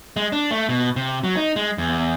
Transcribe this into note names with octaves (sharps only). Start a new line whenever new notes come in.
G#3
D4
A3
B2
C3
F#3
D#4
G#3
E2